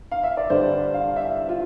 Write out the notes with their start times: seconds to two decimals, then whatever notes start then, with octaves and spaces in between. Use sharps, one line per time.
0.11 F5
0.23 E5
0.37 D5
0.50 G2 D3 G3 D4 C5
0.94 F5
1.16 E5
1.49 F4